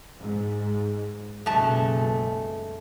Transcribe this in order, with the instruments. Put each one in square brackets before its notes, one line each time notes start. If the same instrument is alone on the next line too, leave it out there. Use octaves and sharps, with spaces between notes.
[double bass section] G#2
[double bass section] F#1 B1 [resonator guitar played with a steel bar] G#3 A3 A5